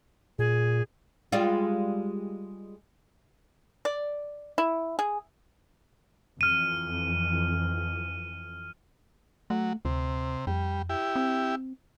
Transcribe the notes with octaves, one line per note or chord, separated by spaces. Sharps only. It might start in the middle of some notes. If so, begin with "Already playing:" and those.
A#2 G#4
G3 G#3 F4
D5
E4
G#4
F2 E3 F6 D#7
F#3 A3
D2 C3
F2 G3
E4 G4
C4